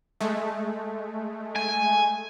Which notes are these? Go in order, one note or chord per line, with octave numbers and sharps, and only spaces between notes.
G#3 A3
G#5